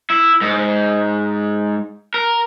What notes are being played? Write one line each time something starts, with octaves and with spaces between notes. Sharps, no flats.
E4
G#2
A#4